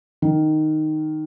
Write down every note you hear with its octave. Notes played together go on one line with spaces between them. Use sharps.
D#3